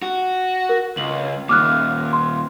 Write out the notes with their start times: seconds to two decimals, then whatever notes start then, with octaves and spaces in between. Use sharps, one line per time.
0.02 F#4
0.69 A#4
0.97 C#2 F#7
1.49 D#2 A#2 D6 F6 F#6
2.13 C6